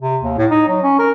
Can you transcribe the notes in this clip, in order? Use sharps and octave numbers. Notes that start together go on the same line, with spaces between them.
C3
D#2
A2
D#4
F#3
C#4
A#4